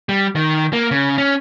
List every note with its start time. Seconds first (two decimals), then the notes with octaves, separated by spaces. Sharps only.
0.09 G3
0.36 D#3
0.73 A#3
0.91 C#3
1.18 C#4